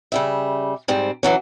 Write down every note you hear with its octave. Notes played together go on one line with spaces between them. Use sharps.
C#3 G3 E5
G#2 G3 C4
E3 F#3 C#4